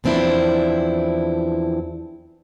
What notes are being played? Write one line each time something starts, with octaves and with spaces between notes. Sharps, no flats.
E2 F3 C4 D4 E4